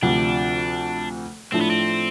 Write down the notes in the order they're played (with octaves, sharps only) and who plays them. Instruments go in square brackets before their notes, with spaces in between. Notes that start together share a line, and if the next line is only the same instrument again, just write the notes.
[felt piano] D2 C3 F3 [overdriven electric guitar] D4
[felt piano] A2 F3 A3 D4 [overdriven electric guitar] C4
[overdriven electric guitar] B3
C4